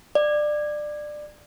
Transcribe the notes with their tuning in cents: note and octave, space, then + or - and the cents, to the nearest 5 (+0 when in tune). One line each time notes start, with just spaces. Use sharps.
D5 +20